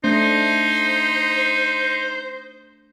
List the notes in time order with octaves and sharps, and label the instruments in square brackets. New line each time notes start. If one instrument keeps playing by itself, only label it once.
[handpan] A3 D4 [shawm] D#4 [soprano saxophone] C5